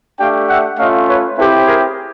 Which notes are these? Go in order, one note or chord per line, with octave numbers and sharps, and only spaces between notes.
A3 D4 G4 F5 G5
E5 F#5
A3 C#4 F4 D#5 F5
B4 C#5
C4 E4 G4 A4 B4
G#4 A#4